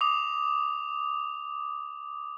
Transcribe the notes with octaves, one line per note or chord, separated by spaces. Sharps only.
D6 D#6 F7